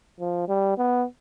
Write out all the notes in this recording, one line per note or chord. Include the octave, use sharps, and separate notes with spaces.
F3
G3
B3